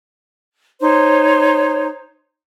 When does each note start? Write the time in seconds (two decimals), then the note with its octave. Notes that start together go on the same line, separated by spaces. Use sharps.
0.80 D#4 C5 C#5